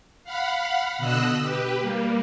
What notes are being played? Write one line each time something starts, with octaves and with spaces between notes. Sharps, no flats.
F5 F#5 B5
B2 D3 D#5 E6 F#6
G4 B4
G3 A#3